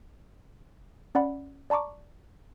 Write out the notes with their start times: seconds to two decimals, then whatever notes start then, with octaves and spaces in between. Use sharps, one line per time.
1.15 C#4 D5 F#5 B5
1.70 D5 A5 A#5 C#6 D6